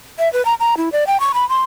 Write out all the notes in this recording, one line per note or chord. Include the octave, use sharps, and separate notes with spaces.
E5
B4
A#5
A#5
E4
D5
G5
C#6
B5
C6